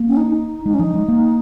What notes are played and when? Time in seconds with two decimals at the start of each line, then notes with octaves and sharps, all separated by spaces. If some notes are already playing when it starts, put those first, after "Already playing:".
Already playing: A#3
0.08 C#4
0.17 D#4
0.27 D#4
0.65 G#3 D#4
0.74 C#4
0.79 F3 D#4
0.94 G#3
1.08 A#3